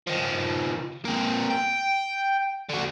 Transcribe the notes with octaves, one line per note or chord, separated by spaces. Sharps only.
D#3 F3
A#3 C4
G5
D3 F#4